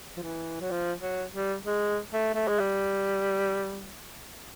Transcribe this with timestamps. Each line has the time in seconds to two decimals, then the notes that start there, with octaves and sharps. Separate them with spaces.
0.17 F3
0.23 E3
0.60 F#3
0.71 F3
1.01 F#3
1.34 G3
1.65 G#3
2.13 A3
2.34 A3
2.47 G#3
2.59 G3